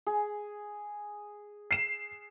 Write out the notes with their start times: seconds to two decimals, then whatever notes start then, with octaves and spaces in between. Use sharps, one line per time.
0.07 G#4
1.71 C7 E7